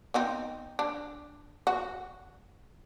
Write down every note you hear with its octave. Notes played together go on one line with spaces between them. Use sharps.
B3 C4 D#4
D4
F#4